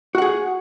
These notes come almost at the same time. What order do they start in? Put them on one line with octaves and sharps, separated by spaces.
F#4 F#5 G#4